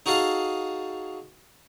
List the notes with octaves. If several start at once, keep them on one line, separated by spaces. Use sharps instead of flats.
D#4 F#4 G#4 A4 F5